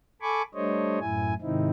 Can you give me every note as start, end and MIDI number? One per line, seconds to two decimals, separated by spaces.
0.22 0.42 69
0.22 0.42 80
0.22 0.42 83
0.22 0.42 85
0.22 0.42 86
0.54 0.99 55
0.54 0.99 57
0.54 0.99 62
0.54 0.99 72
0.54 0.99 73
0.54 0.99 75
1.00 1.34 42
1.00 1.34 45
1.00 1.34 64
1.00 1.34 80
1.41 1.71 44
1.41 1.71 48
1.41 1.71 51
1.41 1.71 60
1.41 1.71 63
1.41 1.71 64